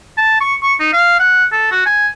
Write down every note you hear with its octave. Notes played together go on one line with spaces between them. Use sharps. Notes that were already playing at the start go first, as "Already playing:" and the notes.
A5
C#6
C#6
D#4
F5
F#5
A4
F#4
G#5